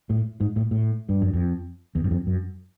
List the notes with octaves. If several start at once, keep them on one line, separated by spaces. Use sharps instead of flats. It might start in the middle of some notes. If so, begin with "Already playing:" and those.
A2
G#2
A2
A2
G2
F#2
F2
E2
F#2
F2
F#2